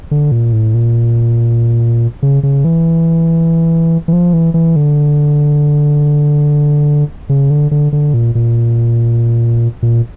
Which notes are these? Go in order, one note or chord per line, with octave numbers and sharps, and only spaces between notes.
D3
A#2
A2
A#2
C#3
C#3
E3
E3
F3
E3
E3
D3
C#3
D3
D3
D3
A#2
A#2
A#2